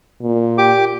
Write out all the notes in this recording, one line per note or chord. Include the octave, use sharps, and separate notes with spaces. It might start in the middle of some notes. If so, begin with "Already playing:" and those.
A#2
G4 D6